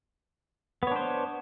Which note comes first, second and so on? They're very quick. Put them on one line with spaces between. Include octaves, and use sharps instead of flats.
B3 C#5 D4 C5